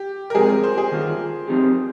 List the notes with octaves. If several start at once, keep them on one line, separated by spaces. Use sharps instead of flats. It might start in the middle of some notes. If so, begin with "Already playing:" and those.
Already playing: G4
A#4
F2 C3 F3 G#3 G#4
A#4
C5
G#4
G2 D#3 A#3 F4
F3 C4 D#4 G4